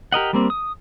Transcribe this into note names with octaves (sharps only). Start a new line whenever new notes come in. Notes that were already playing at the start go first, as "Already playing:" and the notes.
G4 A#4 D#5 F#5
G3 A#3 C4
D#6